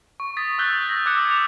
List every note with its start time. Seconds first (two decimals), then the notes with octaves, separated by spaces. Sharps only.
0.20 C#6
0.37 D#6 A6 B6
0.58 C#6 E6 F#6 G6 G7
0.89 A#6
1.06 D6 E6 F#6 G#6 C#7
1.27 G#6 F7